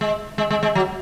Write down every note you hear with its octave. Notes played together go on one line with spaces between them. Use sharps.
G#3
G#3
G#3
G#3
F#3